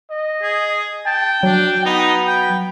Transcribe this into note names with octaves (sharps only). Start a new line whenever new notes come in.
D#5
G#4
G5 A5
F#3 D4
B3 D#4
G5